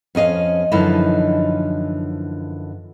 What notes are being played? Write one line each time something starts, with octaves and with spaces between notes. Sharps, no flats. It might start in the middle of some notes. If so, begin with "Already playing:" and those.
F2 C#4 D#5 F5
F#2 D3 E3 F3 D#4 E4